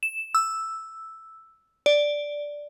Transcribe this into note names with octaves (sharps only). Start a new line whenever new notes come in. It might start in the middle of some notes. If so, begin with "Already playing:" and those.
E7
E6
D5